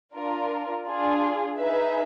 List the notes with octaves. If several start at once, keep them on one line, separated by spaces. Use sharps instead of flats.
D4 F4 A#4
D4 F4 G#4
D#4 G#4 B4 E5